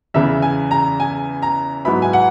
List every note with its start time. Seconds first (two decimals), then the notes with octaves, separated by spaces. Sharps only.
0.14 E2 C#3 E3 E5
0.42 G#5
0.71 A#5
1.00 G#5
1.42 A#5
1.85 G#2 F#3 B3 E4 B5
2.02 G#5
2.13 F#5